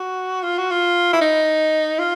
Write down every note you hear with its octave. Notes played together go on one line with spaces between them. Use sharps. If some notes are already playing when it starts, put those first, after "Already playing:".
Already playing: F#4
F4
F#4
F4
E4
D#4
F4